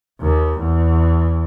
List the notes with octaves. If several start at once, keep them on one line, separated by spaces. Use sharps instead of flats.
D#2
E2